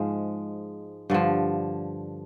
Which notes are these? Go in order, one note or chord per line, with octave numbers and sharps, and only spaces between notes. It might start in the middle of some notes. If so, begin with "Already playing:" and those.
Already playing: G#2 F3 G#3
G2 D3 F3